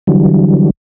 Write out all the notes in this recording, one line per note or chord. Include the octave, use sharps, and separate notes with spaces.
D3 E3 F#3 G3